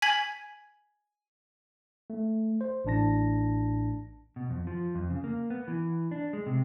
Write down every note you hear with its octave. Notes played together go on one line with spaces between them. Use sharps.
G#5 G#6 B6 F#7
A3
C5
A1 A2 D4 A5 A#6
B2
F2
F3
F2
C#3
A#3
B3
E3
D4
G#3
C3